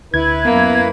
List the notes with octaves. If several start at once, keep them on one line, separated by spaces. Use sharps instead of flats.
D2 E4 B4 G#6
F#2 A#3 B3